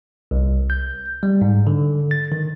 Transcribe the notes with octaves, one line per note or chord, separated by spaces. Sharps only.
C2
G6
G3
G#2
D3
A6
D#3